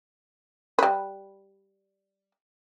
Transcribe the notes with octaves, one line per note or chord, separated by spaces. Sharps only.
G3 B4